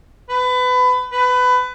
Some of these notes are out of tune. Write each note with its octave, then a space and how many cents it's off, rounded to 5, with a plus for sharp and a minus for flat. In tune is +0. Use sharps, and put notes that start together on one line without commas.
B4 +25
B4 +20